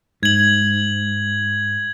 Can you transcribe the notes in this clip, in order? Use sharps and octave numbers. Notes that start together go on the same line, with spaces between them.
G#2 G#6 F#7